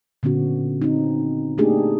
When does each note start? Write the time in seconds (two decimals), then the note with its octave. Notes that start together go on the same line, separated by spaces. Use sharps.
0.23 A#2 D3 B3 C#4 F#4
0.82 C4 D#4
1.58 A3 A#3 D4 D#4 G4 G#4